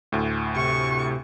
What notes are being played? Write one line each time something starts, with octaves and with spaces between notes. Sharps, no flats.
D2 A2
C3 C#6